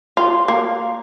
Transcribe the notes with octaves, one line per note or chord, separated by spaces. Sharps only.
F4
A#3